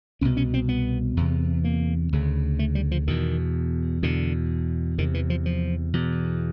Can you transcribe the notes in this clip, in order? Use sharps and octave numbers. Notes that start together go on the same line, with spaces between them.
C2 B2 C#4
C#4
C4
B3
E2 C3
A#3
D2 C#3
A3
G3
F3
E2 B2 D#3
E2 B2 D3
E2 C3 D#3
E3
F3
F3
E2 B2